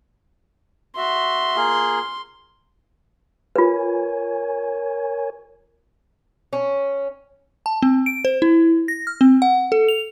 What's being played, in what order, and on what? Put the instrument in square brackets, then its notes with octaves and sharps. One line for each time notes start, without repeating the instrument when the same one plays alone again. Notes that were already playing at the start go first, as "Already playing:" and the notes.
[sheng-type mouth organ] F#4 E5 [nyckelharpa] C6
[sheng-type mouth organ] A#3 F4 G#4
[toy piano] F4 B4 [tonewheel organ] A#4 C#5 G#5
[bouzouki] C#4
[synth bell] A5
C4
D7
C5
E4
A#6
F6
C4
F#5
A4
F7